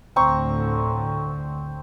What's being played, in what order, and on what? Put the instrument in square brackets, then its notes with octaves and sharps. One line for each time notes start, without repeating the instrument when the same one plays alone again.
[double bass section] D2 A2 D3 [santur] C4 A#5 C#6